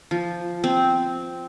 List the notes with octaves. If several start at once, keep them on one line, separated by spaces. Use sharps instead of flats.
F3
C4